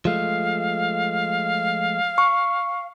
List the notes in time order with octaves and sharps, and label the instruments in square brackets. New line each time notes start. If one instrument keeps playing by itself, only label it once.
[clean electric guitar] F3 G#3 A3 [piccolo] F5
[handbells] C#6